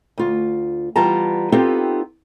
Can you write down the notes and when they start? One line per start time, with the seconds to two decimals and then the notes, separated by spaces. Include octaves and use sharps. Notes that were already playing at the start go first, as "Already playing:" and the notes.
0.18 D2 F4
0.96 E3 G3 B3 F4 A5 A#5
1.52 B3 C4 D#4 F4 G4 A4